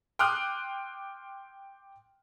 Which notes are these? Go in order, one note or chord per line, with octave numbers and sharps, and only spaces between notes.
G5 C6 D6 D#6 F6 F#6